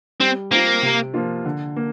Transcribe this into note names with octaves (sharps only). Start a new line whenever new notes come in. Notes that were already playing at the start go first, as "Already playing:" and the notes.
G3 C4
A#3 C4 F4
C3
F3 A#3 F4
D3
A#3